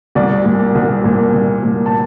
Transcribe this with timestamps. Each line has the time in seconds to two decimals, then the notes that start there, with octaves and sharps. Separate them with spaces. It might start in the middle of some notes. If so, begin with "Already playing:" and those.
0.15 C2 D5
0.45 A#2
0.75 C2
1.04 A#2
1.34 C2
1.63 A#2
1.86 A5